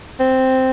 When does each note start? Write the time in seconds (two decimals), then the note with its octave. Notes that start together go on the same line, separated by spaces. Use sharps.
0.20 C4